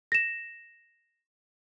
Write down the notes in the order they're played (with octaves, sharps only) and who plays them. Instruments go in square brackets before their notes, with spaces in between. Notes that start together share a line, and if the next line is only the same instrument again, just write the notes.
[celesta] A#6 E7